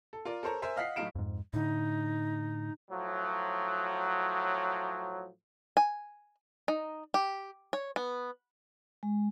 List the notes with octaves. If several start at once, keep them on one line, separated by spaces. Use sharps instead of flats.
A4
F4 A#4 D5
A4 A#4 C5 C#5 A#5
A#4 C5 E5 G#5
D#5 F5 F#5 B6 C7
A2 F#3 D#4 F5 D7 E7
F2 G#2
A2 D3 D#4
A2 F3 F#3
G#5
D#4
G4
C#5
B3
G#3